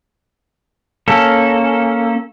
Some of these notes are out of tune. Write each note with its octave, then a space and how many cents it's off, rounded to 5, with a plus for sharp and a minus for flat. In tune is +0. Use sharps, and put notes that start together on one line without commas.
A#3 -5 C#4 +0 A4 +0